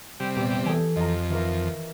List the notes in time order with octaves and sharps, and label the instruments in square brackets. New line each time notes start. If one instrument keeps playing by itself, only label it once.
[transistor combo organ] C3 G3
[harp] E2 G4 [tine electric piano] A#2
[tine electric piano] E3 A4 [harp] G#5 D#6
[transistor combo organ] F2 [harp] D#5 A#5
[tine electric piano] D#3 [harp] E3 F4 A#4